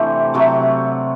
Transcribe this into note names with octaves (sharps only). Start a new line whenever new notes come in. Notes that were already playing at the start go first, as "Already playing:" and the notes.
Already playing: C3 E3 A3 D4 G4 A4 C5
C3 F#3 A3